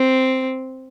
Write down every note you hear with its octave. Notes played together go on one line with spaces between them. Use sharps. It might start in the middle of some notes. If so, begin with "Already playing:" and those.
Already playing: C4